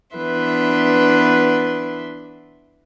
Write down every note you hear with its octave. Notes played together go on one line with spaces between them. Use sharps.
E3 B3 D4 B4 E5 C6